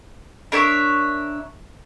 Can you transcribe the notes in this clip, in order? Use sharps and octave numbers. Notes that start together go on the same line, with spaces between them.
D4 A#4 C#5 E5